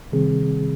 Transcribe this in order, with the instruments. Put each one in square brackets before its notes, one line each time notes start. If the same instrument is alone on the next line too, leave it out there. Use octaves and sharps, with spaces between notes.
[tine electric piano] C3 D#3 G3 C4 G#4